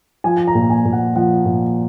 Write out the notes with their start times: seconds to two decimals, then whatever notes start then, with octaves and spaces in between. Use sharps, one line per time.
0.24 F3 G#5
0.37 G#5
0.48 A#5
0.55 A#2
0.70 G#5
0.85 A#2
0.93 F#5
1.16 F3 F#5
1.46 A#2